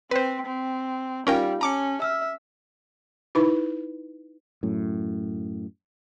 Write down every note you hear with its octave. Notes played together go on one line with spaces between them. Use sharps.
C4 B4 C5 B6
C4
G3 C#4 D#4 F4 A#4 F5 G5
C#4 A5 A#5 D6 C#7
E5 E6 F6
D#4 E4 B4 B5
F#2 A2